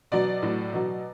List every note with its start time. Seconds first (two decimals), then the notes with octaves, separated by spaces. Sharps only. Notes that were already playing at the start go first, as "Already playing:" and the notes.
0.12 B2 F#3 D5
0.43 A2 F#3
0.73 B2 F#3